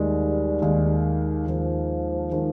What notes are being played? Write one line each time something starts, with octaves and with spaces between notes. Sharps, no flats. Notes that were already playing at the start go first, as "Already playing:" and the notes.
Already playing: D#2 D#3 G3 G#3
D#2 D#3 G#3
D#2 D#3 F3 G#3
D#3 G#3